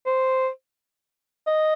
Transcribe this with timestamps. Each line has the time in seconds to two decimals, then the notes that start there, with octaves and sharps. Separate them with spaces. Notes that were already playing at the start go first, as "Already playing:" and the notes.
0.06 C5
1.47 D#5